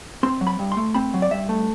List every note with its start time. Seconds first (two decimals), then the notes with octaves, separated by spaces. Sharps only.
0.23 C4 C6
0.41 F#3
0.47 B5
0.59 G2
0.72 C6
0.77 A3
0.94 C4 B5
1.14 F#3
1.22 D5
1.31 G2 E5
1.49 A3